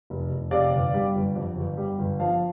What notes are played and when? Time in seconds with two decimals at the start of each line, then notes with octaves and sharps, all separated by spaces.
0.10 F1
0.31 F1
0.51 C3 D5 F5
0.73 G1
0.94 G3
1.15 G1
1.36 F2
1.57 G1
1.77 G3
1.99 G1
2.20 F3 F5 A5